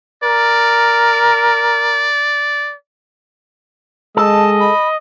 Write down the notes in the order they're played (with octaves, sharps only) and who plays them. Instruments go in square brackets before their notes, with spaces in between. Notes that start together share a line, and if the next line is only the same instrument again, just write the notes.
[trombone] A#4 [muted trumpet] D5
[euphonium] G#3 [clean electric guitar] A4 [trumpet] D#5 [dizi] A5
[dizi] B5